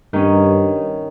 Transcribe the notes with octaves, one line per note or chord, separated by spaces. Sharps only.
G2 D#3 C#4